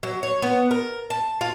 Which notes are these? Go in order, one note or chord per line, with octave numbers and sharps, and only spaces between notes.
F#3
C#5
B3
A#4
A5
F4